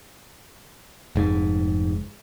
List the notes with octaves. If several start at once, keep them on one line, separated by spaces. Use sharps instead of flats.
F1 G#2